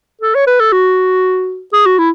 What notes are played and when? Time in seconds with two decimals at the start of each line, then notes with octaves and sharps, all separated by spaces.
0.21 A4
0.35 C#5
0.47 B4
0.60 A4
0.72 F#4
1.73 G#4
1.86 F#4
1.98 E4